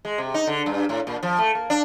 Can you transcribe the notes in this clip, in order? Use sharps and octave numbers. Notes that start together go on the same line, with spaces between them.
G#3
C3
D#4
D3
G2
A2
A#2
F3
A3
A#3
D4